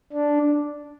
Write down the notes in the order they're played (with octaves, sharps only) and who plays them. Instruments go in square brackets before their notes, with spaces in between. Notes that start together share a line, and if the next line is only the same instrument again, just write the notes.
[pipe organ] D4